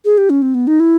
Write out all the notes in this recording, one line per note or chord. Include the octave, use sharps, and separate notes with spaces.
G#4
G4
C#4
C4
B3
D#4
E4